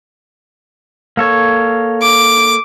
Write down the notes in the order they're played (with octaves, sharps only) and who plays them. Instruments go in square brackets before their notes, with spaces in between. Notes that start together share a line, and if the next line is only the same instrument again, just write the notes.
[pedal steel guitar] A#3 A4 C#5
[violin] D6